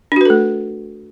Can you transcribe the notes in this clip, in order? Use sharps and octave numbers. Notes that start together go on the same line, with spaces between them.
A3 D4 F#4 A4 B4